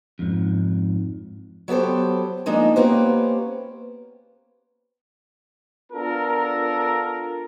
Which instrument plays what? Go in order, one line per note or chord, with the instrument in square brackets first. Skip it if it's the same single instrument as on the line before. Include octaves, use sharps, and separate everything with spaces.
[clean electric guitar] F2 G#2
[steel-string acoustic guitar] F#3 B3 G4 A4 C5
F3 G#3 A#3 D4 D#4
A#3 B3 C#4 G4 B4 C5
[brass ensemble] B3 D4 F4 A4 A#4